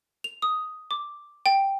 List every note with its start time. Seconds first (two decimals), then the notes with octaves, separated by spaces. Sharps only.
0.24 F7
0.42 D#6
0.91 D6
1.46 G5